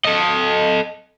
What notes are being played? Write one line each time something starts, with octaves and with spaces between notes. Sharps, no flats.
A4 D#5